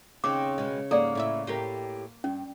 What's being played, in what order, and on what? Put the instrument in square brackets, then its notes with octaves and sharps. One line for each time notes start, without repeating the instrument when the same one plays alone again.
[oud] D#2 C4 [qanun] C#3 D#5 [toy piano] D6
[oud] B2 G#3
[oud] G#2 [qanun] A#3 F#5 [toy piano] A4 D5
[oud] A2 E4 E5
[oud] A2 G4 A#4 [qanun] C6
[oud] G2 [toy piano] C#4